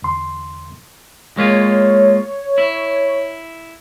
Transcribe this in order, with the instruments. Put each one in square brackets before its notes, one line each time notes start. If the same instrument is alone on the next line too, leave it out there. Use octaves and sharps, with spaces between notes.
[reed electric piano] E2 D3 C6
[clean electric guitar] G#3 A#3 F4 [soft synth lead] C#5
[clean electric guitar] E4